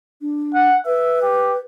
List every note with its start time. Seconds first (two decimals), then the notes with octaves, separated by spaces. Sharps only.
0.21 D4
0.54 F#5
0.86 B4 E5
1.22 G4